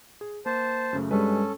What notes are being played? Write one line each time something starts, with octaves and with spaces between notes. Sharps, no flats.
G#4
A#3 C5 A5
F#2 C#3 A3
G2 G3 G#3 C#4 A4 B4